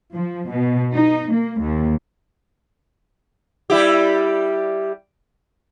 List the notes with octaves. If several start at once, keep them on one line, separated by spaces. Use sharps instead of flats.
F3
B2
D#4
A#3
D#2
G3 E4 G4